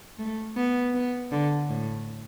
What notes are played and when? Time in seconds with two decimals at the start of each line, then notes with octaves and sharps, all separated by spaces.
0.19 A3
0.56 B3
0.94 B3
1.32 D3
1.70 A2